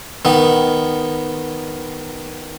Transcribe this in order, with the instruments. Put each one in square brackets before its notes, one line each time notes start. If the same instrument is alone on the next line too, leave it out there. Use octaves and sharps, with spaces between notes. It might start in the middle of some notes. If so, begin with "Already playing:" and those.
[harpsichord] D#3 B3